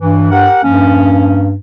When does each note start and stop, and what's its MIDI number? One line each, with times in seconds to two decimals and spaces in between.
0.01 0.47 43
0.01 0.31 52
0.31 0.60 67
0.31 0.60 70
0.31 0.60 78
0.64 1.55 43
0.64 1.53 53
0.64 1.53 58
0.64 1.53 61